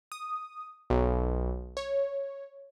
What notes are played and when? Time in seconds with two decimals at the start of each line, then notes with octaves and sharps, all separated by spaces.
0.12 D#6
0.90 B1
1.77 C#5